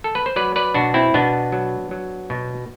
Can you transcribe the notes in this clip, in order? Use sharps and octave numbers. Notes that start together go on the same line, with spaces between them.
A4
B4
C5
F#3 B4 D5
B4 D5
B2 D4 F#4
C4 E4
B2 B3 D4
F#3
F#3
B2